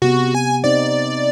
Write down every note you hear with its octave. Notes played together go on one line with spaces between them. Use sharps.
C3 B3 F#4
G#5
C4 D#4 D5